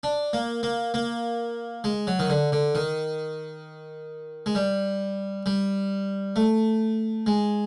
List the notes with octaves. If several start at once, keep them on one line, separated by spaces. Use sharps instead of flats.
D4
A#3
A#3
A#3
G#3
F#3
D#3
D3
D3
D#3
G#3
G3
G3
A3
G#3